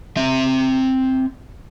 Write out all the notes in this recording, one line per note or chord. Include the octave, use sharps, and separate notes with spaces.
C4 E5